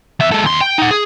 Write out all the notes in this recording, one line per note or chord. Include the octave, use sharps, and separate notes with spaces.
E2 E5
G#3 A4
D#2 C6
G5
D#4 F#5
G#4